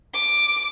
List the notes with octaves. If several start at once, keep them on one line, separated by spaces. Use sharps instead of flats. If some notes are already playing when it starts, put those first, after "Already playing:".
D6